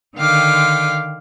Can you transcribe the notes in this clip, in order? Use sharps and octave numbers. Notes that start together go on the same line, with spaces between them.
D3 D#3 F5 G5 D6